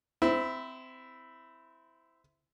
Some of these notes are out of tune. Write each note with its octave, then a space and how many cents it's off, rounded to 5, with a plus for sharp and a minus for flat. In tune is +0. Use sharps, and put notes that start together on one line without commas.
C4 -20 E4 +0